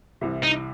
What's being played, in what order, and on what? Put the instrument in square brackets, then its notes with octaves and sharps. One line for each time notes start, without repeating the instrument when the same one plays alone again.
[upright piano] C2 C3 E3
[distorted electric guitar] D#4